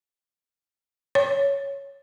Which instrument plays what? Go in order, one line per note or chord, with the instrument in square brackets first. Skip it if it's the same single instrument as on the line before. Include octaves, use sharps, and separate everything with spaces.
[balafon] C#5